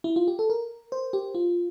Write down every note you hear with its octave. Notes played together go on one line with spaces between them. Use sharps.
E4
F4
G4
A4
A#4
C5
G4
F4